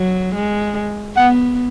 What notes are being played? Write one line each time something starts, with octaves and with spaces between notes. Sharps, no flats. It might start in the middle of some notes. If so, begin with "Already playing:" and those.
Already playing: F#3
G#3
B3 F#5